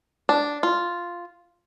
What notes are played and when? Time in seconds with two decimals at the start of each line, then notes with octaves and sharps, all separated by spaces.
0.29 D4
0.63 F4